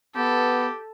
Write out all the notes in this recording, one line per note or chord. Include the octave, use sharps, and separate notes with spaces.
B3 G4 A4